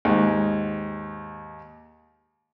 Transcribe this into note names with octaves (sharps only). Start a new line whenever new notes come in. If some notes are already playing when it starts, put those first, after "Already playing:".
D#2 G#2 G#3